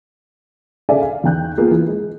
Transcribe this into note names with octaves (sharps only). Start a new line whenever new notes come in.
G#4 A4 D5 E5 F5 G#5
F5
E2 D#3 G5 F#6 G6
A#3 B3 F4 G#4
E3
G#3